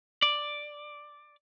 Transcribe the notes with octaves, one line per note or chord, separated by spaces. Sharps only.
D5